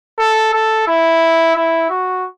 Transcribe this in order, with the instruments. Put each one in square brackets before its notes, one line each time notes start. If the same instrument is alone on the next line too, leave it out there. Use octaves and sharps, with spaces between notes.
[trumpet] A4
A4
E4
E4
F#4